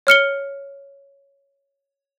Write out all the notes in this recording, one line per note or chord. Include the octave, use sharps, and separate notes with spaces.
C#5 F6 C#7 G7